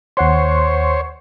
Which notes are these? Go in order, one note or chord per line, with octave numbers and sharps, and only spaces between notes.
D#2 C5 C#5 F#5 C6